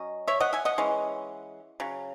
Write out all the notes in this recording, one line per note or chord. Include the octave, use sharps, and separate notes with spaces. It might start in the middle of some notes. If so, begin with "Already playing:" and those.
Already playing: F#3 C#4 D#5
C#5 E5
D#5 F#5
E5 G#5
D#5 F#5
E3 G#3 C#4
C#3 F#3